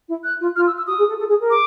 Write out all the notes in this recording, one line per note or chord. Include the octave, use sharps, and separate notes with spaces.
E4
F#6
F4
F4 F6
E6
E6
F#4 D#6
G#4
A4
A4
G#4
A#4
D6